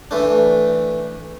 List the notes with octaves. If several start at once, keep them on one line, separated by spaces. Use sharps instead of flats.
E3 A3 D4